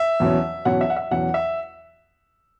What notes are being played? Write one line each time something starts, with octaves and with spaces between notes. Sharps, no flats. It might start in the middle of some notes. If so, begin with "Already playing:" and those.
Already playing: E5
E2 B2 F#3 C#4
E2 B2 F#3 C#4 F#5
E5
F#5
E5
E2 B2 F#3 C#4 F#5
E5